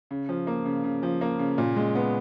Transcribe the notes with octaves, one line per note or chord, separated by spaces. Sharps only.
C#3
F3
A#3
C#3
C#3
F3
A#3
C#3
A#2
G#3
B3